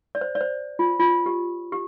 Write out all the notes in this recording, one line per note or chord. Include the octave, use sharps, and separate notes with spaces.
D5
C5
D5
C5
F4
F4
G4
G4